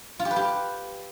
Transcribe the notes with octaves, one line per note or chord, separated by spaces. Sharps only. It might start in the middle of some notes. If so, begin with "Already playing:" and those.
F4
G4
B4
G4